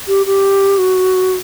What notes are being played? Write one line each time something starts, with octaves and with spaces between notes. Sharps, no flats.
G4
G4
F#4